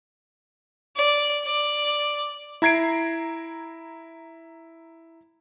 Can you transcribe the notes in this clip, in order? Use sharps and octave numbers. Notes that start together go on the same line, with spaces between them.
D5
D5
E4 A#5 G#6 C7 D7